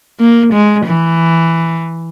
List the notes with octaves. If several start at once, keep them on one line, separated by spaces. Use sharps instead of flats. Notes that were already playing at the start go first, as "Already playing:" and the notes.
A#3
G#3
E3